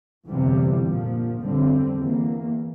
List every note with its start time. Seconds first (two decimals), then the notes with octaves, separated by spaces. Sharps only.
0.27 G1 F2 C3 E3 G3
0.84 A#1 A#2 F3
1.40 G1 F2 D3 G3 C4
1.97 E2 E3 A#3